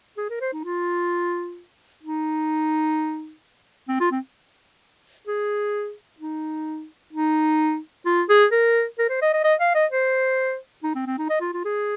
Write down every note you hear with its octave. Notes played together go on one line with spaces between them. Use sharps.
G#4
A#4
C5
D#4
F4
D#4
C4
F4
C4
G#4
D#4
D#4
F4
G#4
A#4
A#4
C5
D#5
D#5
D#5
F5
D#5
C5
D#4
C4
C4
D#4
D#5
F4
F4
G#4